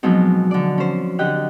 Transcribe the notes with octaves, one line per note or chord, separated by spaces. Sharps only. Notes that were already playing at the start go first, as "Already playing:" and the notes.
B2 F3 F#3 G#3 C4 D#4
D3 D5
C#4 C5
D3 G4 D#5 F#5 G5 F#6